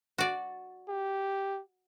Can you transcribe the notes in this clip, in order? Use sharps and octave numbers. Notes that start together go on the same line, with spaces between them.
F#4 D5
G4